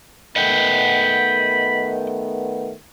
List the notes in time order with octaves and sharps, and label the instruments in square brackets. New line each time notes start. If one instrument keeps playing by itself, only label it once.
[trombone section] D#3 A3 B3 [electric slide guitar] D#5 F#5 G5 [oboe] B5